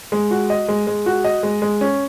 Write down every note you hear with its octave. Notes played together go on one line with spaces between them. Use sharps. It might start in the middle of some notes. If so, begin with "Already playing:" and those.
G#3
F#4
D#5
G#3
G#3
F#4
D#5
G#3
G#3
C#4